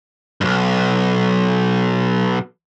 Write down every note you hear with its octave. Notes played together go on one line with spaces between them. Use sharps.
B1 G2